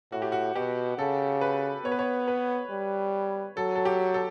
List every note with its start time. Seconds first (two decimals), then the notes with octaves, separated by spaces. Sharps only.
0.12 A2 F#4
0.22 G4
0.32 F#4
0.55 B2 G4
0.98 C#3 A4
1.41 B4
1.85 B3 C#5
1.92 B4
1.99 C#5
2.28 B4
2.70 G3
3.57 F#3 A4
3.76 A4
3.85 G4
4.14 A4